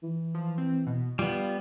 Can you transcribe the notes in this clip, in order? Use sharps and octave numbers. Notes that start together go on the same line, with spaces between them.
E3
F3
C4
B2
G3 B3 F4